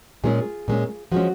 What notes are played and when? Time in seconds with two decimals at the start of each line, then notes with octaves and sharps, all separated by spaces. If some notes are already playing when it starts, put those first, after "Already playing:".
0.24 A#2 G#3 C#4 F4 G#4
0.68 A#2 G#3 C#4
1.12 F3 G#3 C#4 F#4